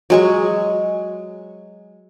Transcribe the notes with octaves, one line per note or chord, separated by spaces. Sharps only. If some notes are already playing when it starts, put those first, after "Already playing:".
F#3 G#3 C#6